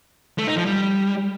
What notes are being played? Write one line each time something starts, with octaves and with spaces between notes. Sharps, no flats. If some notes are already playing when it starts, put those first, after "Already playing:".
A3
D#4
F3
G3